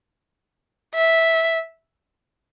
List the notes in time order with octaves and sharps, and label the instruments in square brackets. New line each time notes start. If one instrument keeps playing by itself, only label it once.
[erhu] E5